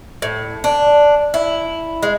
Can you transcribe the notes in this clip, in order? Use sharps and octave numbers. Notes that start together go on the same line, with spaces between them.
A2
D4
E4
G#3